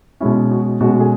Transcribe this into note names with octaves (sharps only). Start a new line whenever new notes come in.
B2 G#3 C#4 E4
F#4
B2 G#3 C#4 F#4
G#4